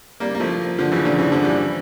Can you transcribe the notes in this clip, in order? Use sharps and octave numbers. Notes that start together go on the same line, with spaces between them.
G3 A#3
A#3
F3 A3
D3 F3
C#3 E3
A#2 D3
C#3 E3
D3 F3
E3 G3